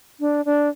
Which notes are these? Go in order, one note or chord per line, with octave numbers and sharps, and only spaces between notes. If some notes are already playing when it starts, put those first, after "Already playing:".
D4
D4